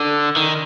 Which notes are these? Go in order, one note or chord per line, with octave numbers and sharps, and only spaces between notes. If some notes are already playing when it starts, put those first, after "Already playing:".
Already playing: D3
D#3